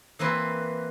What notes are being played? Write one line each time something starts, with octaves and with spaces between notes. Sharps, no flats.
E3 A#3 C4 B4